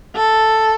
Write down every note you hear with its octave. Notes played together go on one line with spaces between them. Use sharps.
A4